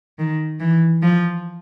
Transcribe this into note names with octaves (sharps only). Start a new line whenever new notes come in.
D#3
E3
F3